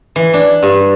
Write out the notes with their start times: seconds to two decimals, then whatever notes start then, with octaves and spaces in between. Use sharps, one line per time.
0.16 E3
0.34 D4
0.63 G2